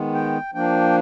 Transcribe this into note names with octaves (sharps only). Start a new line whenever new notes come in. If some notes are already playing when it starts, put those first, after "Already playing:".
Already playing: D#3 G#3 B3
G5
F3 A#3 D4 G5